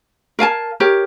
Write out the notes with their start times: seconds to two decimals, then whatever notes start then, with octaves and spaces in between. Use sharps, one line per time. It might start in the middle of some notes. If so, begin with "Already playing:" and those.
0.39 A#4 F5 G#5 A5
0.80 G4 A#4 C#5